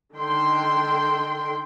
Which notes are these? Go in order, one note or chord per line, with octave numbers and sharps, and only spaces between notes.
D3 D#3 G5 C6